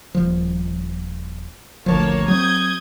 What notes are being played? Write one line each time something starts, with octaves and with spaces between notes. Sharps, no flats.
D#1 F3
G#1 D2 F3 A#3 C#5 A5
F#3 C4 D#6 G6 G#6